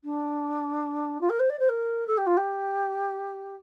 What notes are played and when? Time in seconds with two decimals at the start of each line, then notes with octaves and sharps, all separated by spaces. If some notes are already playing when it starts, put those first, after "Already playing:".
0.04 D4
1.21 F4
1.29 A#4
1.39 C5
1.49 D5
1.59 C5
1.69 A#4
2.07 A4
2.17 G4
2.26 F4
2.37 G4